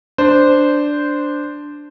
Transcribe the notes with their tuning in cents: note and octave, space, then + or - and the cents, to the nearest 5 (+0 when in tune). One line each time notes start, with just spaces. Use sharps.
D4 +0 C5 -10